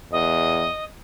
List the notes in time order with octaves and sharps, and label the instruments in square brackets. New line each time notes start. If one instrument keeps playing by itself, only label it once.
[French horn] E2 [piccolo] D#5